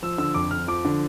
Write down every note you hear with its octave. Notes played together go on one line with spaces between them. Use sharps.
F3 E6
D3 E6
F2 D6
F2 F6
F3 D6
D3